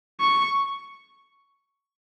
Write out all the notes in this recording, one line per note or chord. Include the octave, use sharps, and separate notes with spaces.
C#6